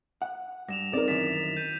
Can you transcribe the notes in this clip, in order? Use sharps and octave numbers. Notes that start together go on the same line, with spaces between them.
F#5
G2 A#6 E7 F7
C4 D#4 A#4 D5
F#2 D#3 E3 A6 B6 E7
A6 F7
G6 D#7